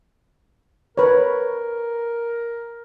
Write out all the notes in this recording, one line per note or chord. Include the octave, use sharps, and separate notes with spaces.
A#4 B4 C#5